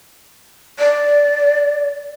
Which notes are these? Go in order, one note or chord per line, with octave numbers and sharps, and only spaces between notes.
D5